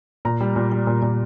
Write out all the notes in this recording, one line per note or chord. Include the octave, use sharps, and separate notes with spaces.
A#2 A#5
G3
A#2
G3
A#2
A#2